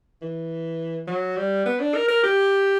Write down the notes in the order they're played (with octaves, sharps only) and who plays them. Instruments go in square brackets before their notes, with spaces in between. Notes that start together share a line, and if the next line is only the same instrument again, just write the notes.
[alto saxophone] E3
F#3
G3
B3
D4
A#4
A#4
G4